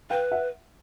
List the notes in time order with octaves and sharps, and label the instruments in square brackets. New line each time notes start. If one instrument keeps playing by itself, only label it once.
[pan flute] B4 [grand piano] F5 G5
[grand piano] E5 F#5